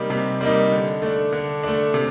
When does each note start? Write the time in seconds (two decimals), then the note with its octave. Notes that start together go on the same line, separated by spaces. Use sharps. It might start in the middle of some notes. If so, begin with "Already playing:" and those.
Already playing: C3 G3 A#3 D#4
0.10 C3
0.41 G3 A#3 D#4
0.72 D3
1.02 A3 D4
1.33 D3
1.64 A3 D4
1.94 C3